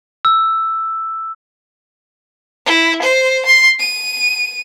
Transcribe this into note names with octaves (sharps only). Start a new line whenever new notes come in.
E6
E4
C5
C6
D#7